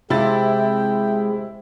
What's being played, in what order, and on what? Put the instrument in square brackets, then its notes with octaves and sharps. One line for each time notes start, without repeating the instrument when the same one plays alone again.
[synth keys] C3 [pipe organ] G#3 [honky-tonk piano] E4 A6 [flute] G5